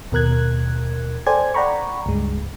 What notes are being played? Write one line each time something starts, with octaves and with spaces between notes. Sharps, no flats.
D#2 B2 A#4 F#6 G#6
A4 C5 D5 G5 G#5 G#6
D5 F#5 G5 A#5 B5 C#6
C#2 G2 G#3